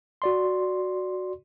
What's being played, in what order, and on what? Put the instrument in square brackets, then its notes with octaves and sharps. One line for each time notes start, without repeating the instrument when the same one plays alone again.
[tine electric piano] F#4 D5 C6